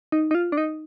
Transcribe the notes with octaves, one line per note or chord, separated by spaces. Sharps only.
D#4
D#4
F4
D4
D#4